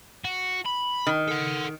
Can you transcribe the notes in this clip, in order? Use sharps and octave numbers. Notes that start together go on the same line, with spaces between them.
F#4
B5
D#3
A4 F#5